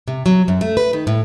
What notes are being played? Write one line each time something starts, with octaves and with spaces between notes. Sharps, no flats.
C3
F#3
F#2
A3
B4
D#3
A2